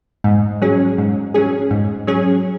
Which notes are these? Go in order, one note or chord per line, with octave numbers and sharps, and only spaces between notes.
G#2
F#3 C#4 G#4
G#2
F#3 C#4 G#4
G#2
F#3 C#4 G#4